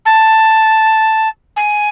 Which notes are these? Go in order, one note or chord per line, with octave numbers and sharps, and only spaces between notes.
A5
G#5